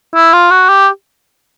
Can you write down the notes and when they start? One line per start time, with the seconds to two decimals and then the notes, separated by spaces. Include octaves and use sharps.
0.15 E4
0.33 F4
0.51 F#4
0.69 G4